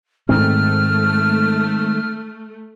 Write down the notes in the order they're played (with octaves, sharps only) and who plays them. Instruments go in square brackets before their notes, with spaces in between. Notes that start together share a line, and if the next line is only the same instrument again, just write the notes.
[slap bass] G#2 D#3 C4 [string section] A3 [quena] F6